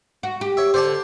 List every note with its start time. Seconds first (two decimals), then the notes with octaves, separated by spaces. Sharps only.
0.23 F#4
0.41 G4
0.57 C#5 E5
0.74 D3 C5 D5 A5